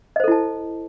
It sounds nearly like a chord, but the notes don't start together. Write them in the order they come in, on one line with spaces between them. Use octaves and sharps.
D#5 C5 A4 E4 A5